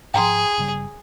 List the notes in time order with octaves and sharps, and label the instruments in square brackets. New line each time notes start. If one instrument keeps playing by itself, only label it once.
[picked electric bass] G#2 F3 [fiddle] G#4 [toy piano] G5 A#5 C6
[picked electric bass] G1 C#3 G3